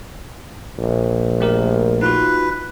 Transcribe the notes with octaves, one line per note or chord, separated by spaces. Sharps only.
A#1
A3 G4 A#4
D#4 F4 F#4 B4